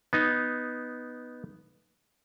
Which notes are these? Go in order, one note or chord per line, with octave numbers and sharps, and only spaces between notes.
B3 D#4